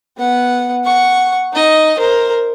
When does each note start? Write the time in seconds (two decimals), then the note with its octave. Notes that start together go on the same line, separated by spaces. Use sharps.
0.18 B3 F#5
0.85 F#5 C#6
1.53 D#4 D#5
1.98 A#4 C5